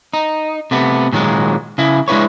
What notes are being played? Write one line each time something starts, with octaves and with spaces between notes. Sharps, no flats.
D#4
C3 A3 B3
A#2 D#3 F#3 G#3
C#3 E4
G#3 D4 E4 B4 C#5